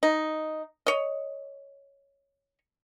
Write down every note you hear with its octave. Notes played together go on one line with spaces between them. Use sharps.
D#4
C#5 D#5